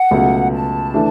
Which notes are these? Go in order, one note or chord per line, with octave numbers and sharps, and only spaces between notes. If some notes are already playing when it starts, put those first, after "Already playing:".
Already playing: F#5
C#2 B2 F#3 A3
A5
E3 A3 D4